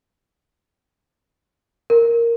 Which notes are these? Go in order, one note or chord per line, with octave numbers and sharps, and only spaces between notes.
A#4